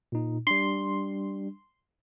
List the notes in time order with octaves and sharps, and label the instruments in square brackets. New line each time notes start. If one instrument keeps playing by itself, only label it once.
[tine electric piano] A#2 D#4
[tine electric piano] G3 D4 [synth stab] C6